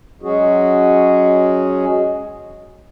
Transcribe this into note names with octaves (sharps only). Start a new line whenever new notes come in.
F#3 G#3 C#4 F#4 G#4